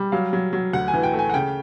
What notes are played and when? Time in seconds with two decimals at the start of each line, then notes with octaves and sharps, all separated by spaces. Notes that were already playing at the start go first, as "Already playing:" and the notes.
Already playing: G3
0.12 F#3 F5
0.33 F#3
0.53 F#3
0.73 D2 F#5
0.88 G#5
0.94 E3
1.03 G5
1.13 A3
1.19 G#5
1.29 F#5
1.34 C#3 G5